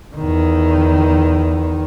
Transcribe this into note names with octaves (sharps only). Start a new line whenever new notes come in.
E2 D#3